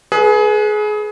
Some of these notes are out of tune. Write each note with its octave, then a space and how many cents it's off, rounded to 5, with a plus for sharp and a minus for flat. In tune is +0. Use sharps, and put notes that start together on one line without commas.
G#4 +25 B4 -20